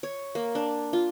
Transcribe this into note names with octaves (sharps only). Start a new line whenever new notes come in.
C#5
A#3
D4
F4